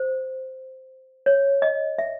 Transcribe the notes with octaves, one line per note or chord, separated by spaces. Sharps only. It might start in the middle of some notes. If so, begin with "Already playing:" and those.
Already playing: C5
C#5
D#5
E5